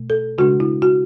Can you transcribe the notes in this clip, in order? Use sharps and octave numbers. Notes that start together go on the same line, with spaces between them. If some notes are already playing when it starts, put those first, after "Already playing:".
Already playing: B2 A3
A4
C#3 G#3 D4 F#4
E4
F#4